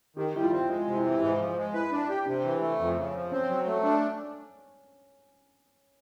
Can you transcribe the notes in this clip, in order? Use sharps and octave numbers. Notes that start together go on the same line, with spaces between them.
D#3 G4
G3 E4
F4
C4
G#3 F4
C3
E4
E3
G#2
F3
G#3
E4 B4
D4
G4
C3 D4
E3
A3
F2
C#3
F3
C4 C#4
F#3
A3
D4